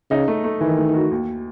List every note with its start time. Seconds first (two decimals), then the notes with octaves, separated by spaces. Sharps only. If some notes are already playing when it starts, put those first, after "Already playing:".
0.10 C#3 D#4
0.28 A3
0.44 A3
0.61 D#3 E3
0.78 A3
0.94 F#4
1.11 D#2